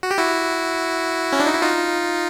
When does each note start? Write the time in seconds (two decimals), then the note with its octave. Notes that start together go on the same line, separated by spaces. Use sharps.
0.03 F#4
0.11 G4
0.18 E4 F#4
1.32 C#4
1.40 D4
1.47 D#4
1.54 E4
1.62 D#4 F4